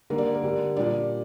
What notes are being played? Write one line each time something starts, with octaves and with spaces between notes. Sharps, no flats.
D3 G3 A#3 A#4
D5
A#4
D3 G3 D4
A#2 G3 D4 D5